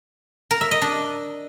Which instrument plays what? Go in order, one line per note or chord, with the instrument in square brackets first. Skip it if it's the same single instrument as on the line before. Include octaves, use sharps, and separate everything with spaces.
[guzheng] A#4
E5
D#5
D4